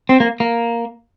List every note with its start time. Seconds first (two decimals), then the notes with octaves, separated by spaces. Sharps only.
0.09 C4
0.20 A#3
0.40 A#3